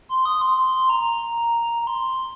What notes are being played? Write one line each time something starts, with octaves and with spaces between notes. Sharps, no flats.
C6
D#6
C6
C6
A#5
A#5
C6